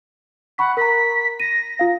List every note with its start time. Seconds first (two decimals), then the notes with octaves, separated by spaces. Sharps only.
0.58 F#5 B5 C#6 B6
0.77 A#4 A#5 B6
1.40 A#6 D#7
1.79 F4 F5